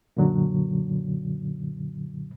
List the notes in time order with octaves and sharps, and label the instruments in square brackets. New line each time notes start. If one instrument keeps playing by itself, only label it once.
[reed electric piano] F#2 A#2 D3 F#3